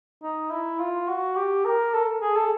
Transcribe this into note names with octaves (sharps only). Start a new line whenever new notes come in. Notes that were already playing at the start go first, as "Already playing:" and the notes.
D#4
E4
F4
F#4
G4
A#4
A4
G#4
A4